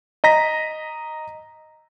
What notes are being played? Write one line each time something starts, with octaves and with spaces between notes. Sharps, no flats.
D#5 A#5 A#6 B6